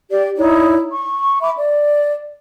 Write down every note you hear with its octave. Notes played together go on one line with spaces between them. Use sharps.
G4 D5
D#4 E4 C#5 D5
C#6
E5 B5 D6
D5